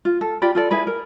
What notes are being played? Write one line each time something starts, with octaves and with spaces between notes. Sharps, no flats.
F4
A4
F4 G4 D5 B5
F4 A4 D5
E4 G#4 B4 B5
A#4